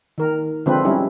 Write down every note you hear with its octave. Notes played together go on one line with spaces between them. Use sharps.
D#3 A#4
D3 F3 G#3 C4 F4 B4
G3 C#4 D#4 E4